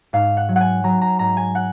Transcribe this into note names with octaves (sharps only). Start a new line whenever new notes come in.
G#2 F5
F#5
F#3
F#5
G#5
F#3 A#5
A#5
G#2 A#5
G#5
F#5